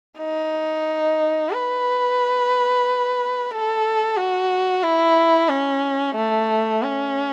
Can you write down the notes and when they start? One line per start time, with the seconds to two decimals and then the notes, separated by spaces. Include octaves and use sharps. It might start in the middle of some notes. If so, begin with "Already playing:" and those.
0.19 D#4
1.51 B4
3.51 A4
4.17 F#4
4.83 E4
5.49 C#4
6.16 A3
6.83 C#4